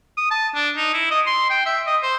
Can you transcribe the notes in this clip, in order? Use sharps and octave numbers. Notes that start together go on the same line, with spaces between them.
D#6
A5
D4
D#4
E4
D#5
C6
G5
E5
D#5
C5